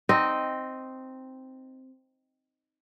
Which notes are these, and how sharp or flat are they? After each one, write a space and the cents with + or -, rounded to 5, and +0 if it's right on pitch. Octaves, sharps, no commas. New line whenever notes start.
C4 +0 D#4 +0 D#5 +0